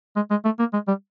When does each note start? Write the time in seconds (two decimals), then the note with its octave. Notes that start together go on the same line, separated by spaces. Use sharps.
0.16 G#3
0.30 G#3
0.45 A3
0.59 A#3
0.73 G#3
0.88 G3